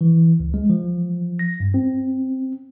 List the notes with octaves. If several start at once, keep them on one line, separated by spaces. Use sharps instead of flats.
E3
C#2
G#3
F3
A#6
G2
C4